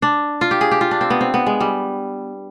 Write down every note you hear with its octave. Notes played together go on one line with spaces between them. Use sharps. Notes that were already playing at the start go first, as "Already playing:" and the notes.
D4
F4
G4
G#4
G4
F4
D4
C4
B3
C4
B3
G#3
G3